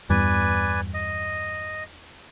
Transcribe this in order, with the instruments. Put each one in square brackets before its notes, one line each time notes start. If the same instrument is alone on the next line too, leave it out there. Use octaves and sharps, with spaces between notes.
[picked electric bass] E2 E3 B3 [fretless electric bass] G2 [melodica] B4 D5 G#5
[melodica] D#5